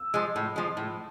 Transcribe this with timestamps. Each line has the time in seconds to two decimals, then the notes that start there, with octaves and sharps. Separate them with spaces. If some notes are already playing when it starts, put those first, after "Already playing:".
Already playing: E6
0.14 F3 G#3
0.36 A2
0.56 F3 G#3
0.77 A2